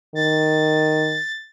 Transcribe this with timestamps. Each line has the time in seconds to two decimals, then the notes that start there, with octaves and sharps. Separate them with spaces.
0.15 D#3 A6